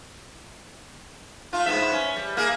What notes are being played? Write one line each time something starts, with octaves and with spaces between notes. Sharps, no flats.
A3 F4
G#2 B3 E5
C#4
G3
A#3 G#4 A#4